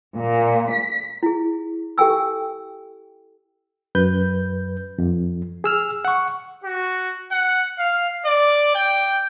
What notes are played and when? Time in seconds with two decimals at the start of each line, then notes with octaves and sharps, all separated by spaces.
0.17 A#2
0.72 B6
1.23 E4 G#4
1.98 G4 A4 G5 G#5 E6
3.95 F#2 B4 G6
4.98 F2
5.64 G#4 E6 F6
6.05 F#5 C#6
6.64 F#4
7.31 F#5
7.79 F5
8.26 D5
8.75 G5